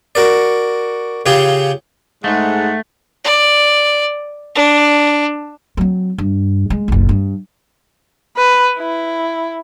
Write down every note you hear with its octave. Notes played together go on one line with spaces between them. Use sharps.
F#4 A#4 D5
C#3 F4 G4 G#4
G#2 G#3 A3 F#5
D5
D4
F#3 C4
G2
G#3
F#1 B1
G2
B4
E4